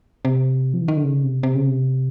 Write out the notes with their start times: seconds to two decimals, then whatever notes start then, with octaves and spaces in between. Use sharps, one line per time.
0.25 C3
0.74 F3
0.81 E3
0.88 D#3
0.97 D3
1.04 C#3
1.24 C3
1.43 C3
1.55 C#3
1.67 C3